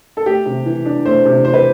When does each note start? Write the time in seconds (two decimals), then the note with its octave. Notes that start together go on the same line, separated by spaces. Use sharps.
0.17 A4
0.26 A3 G4
0.46 C3
0.66 E3
0.85 D4
1.06 A3 C5
1.25 C3
1.45 E3 C5
1.54 B4